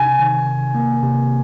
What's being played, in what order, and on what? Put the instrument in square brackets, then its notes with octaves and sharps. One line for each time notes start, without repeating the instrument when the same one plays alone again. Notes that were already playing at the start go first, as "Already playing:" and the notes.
Already playing: [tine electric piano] C3 [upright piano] G#5
[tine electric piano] D#3
C3
A#3
C3